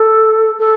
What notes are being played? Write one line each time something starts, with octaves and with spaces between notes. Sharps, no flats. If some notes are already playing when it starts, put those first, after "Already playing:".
Already playing: A4
A4